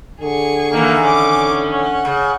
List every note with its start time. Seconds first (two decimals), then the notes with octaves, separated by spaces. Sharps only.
0.21 D3 G#4 C#6
0.73 D#3 E3 A#3
1.02 C#4 D6
1.74 F#5
2.05 C#3